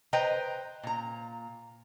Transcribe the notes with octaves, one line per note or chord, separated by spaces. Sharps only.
B4 C5 D#5 G5 A#5
A#2 A#5